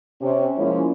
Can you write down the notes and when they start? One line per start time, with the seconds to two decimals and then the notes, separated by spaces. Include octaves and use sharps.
0.21 C3 C#4
0.57 F3 G#3 A#3 C#4 E4